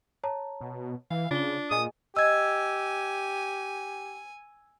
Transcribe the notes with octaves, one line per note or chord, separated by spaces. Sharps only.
C#5 A5 A#5
B2
E3 F5
C#3 D4 F4 G7
A#2 G#4 D#5 G#5 D#6
G4 D#5 G#5 E6 G#6